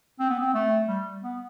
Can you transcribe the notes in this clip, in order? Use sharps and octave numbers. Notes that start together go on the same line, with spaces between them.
C4
B3
C4
A3
G3
B3